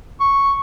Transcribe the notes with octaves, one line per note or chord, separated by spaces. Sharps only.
C#6